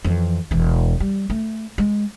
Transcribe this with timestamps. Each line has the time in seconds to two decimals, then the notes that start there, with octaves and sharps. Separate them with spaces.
0.04 F2 E3
0.51 E1 E3
1.00 G3
1.30 A3
1.78 G#3